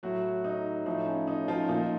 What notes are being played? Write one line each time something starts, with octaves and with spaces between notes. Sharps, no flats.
A2 F#3 F#4
D#4
A2 F3 D#4
C#4
D#4
F3 F4
A#2 F3 D#4